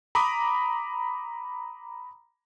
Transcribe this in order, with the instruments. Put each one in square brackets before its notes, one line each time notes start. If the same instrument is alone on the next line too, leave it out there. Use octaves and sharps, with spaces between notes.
[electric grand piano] A#5 B5 D6 D#6